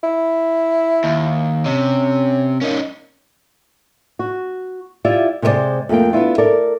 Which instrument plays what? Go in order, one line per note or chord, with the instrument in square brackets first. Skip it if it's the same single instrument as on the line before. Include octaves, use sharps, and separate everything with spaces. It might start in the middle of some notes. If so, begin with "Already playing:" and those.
[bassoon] E4
[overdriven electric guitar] D#2
[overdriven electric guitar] C3 [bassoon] C#4
[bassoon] A#3 [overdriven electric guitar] C#4 D#4
[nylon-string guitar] F#4
E4 F4 G4 D5 E5
C3 G#3 A4 A#4 C5 D5
F2 A3 A#3 G5
B3 D4 E4 F4
A4 A#4 D5